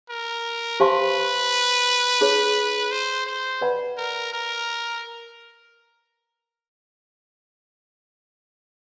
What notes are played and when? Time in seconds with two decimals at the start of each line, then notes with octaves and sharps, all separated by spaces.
0.10 A#4
0.80 G4 B4 C5 F5 A5 C6
2.21 D#4 G#4 C#5
2.92 C5
3.27 C5
3.61 B4 D5 F#5 B5
3.97 A#4
4.33 A#4